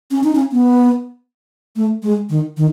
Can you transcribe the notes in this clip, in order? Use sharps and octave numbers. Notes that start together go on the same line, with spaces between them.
C#4
D#4
C#4
B3
A3
G#3
D#3
D#3